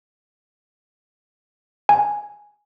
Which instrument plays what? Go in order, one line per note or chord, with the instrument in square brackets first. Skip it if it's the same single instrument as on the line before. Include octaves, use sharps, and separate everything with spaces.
[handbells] G#5